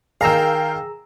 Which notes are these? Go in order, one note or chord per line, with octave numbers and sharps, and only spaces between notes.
D#3 G#4 A#4 F5 G5 A#5 E6